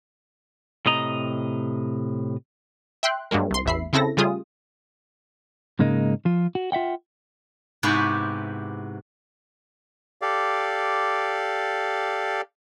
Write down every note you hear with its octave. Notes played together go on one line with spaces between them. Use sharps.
A2 C3 D#5 A#5
E5 G5 C6 F#6
G2 F#3 G#3 A#3
C2 C6
A1 E2 E5 B5 C7
C#3 C4 E4 A4 A#6
C#3 G3 A3 F4 G#4 D#6
G#2 C#3 G#3 A#3 D#4
F3 F4
F#4
F4 E5 F#5 G5
G#2 C3 B3 E4 F#4 G4
G4 A4 D5 F5